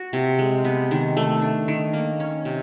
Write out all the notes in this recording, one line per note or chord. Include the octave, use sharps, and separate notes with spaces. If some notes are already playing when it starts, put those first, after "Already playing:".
Already playing: F#4
C3
G#3
B3
D#3
A3
D4
D#3
A#3
C#4
C3